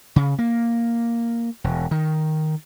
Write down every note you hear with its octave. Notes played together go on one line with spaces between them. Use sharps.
C#3
A#3
E1
D#3